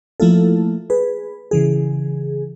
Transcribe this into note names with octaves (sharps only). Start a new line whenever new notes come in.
F3 A3 A#3 E4 F4 A4
G#4 B4
C#3 E3 G#4